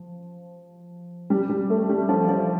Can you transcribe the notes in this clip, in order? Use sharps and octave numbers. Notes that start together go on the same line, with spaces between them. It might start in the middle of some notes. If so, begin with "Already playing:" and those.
Already playing: F3
G3
G3
A3
G3
F3
F3